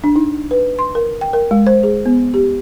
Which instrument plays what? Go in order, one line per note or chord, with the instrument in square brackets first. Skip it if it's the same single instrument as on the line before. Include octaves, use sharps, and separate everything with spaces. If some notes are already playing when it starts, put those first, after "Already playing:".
[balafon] D4
D#4
B4
C6
A#4
G5
A#4
G#3
C5
G#4
B3
G4